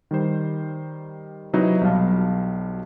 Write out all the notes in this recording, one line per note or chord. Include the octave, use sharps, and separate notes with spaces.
D#3 G3 C5
C3 F#3 D#4 E4 F#4 B4
B1 F#3 G3 F5 A5